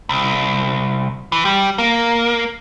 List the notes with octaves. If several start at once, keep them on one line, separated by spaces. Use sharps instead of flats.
C2
E3
G3
A#3